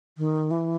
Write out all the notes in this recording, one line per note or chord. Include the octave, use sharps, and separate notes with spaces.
D#3
E3